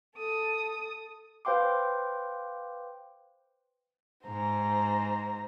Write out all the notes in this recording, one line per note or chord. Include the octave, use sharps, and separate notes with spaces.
A4 D#6
B4 C5 F5 G5 C6 D6
G#2 C5 A#5